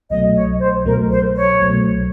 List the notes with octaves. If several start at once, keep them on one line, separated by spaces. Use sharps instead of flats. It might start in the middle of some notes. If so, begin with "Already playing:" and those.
C2 B2 F#3 A3 D#5
C#5
C5
C2 B2 F#3 A3 A#4
C5
C#5
C2 B2 F#3 A3